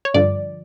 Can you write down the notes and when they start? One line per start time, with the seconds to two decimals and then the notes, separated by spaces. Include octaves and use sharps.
0.05 C#5
0.14 G2 D3 F3 D5